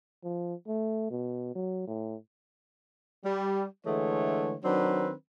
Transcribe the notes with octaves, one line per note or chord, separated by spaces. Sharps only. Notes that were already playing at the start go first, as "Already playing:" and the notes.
F3
A3
B2
F#3
A2
G3
D3 E3 G#3 A3 C#5
D#3 F#3 C4 D4 B4